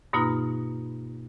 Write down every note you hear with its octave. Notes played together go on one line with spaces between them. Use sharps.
G2 B2 A#3 D#4 F4